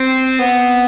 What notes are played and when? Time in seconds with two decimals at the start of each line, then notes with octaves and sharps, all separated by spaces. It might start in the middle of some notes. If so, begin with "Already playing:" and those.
Already playing: C4
0.39 B3